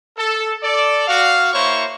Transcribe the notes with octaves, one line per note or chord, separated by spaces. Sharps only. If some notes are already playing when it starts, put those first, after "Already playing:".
A4
A4 D5
F#4 F5
A#3 E4 C5 C#5 C#6